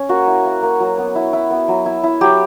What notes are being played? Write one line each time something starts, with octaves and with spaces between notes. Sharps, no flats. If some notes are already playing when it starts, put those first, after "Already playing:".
Already playing: C#4
A#3 F#4
E4
A#3
A#3
F#3
B3
E4
E4
B3
F#3
E4
E4
F#3 G4